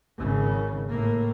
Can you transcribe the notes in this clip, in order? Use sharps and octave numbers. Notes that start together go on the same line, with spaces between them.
G#1 C#3
A2 A#3